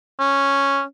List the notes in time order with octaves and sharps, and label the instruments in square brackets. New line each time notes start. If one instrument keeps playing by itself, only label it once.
[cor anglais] C#4